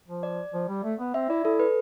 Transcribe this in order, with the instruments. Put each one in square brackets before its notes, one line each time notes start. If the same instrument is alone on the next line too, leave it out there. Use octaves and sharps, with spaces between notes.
[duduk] F3
[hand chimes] D5
[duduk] F3
G3
A3
B3
[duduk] C4 [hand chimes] E5
[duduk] E4 [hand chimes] D5
[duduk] E4 [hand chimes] A4
[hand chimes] B4